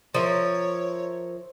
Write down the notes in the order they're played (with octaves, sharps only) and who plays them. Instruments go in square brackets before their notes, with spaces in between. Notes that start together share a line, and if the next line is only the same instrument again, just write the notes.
[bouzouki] F3 A#4 E5 [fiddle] C#5